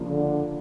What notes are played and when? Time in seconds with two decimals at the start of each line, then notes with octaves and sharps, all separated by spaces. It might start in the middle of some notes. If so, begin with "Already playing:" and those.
Already playing: C#3 F3 A#3 D4 F4
0.09 D3